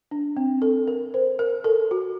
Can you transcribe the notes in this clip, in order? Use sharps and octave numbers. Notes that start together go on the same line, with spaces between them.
D4
C4
A4
A#4
C5
A#4
A4
F#4